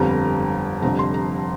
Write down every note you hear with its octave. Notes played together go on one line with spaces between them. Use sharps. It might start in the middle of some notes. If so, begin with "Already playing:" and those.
Already playing: G1 F2 D3 G3 A#5
F1 F2 D3 G3 A#5
C6
A#5